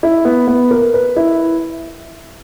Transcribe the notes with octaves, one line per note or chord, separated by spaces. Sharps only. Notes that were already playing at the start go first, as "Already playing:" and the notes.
E4
B3
B3
A#4
B4
E4